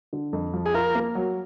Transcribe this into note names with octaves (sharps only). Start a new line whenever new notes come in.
D3
F2
F3
G#4
F4 A#4
A#3
F#3